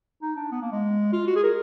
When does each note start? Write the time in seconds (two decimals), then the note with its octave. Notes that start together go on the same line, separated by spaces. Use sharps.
0.22 D#4
0.36 D4
0.52 B3
0.62 A#3
0.72 G#3
1.13 F4
1.27 F#4
1.36 G#4
1.43 A#4